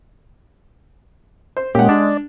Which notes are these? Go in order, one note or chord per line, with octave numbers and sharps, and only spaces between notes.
C5
A#2 G#3 A#3 C#4 G4 F#5
D4 D5